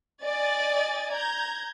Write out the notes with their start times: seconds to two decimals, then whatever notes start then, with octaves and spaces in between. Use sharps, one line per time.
0.22 D5 D#5 G#5 A6
1.14 A#5 G6 G#6